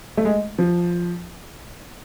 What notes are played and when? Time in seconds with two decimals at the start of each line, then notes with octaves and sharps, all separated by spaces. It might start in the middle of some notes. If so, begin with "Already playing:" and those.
0.17 A3
0.25 G#3
0.58 F3